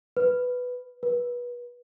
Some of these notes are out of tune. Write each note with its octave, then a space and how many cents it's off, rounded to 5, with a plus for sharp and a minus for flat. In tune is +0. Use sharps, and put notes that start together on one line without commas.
B4 +5
B4 -25